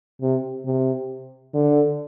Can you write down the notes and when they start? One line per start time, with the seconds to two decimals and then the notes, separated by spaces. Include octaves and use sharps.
0.21 C3
0.65 C3
1.54 D3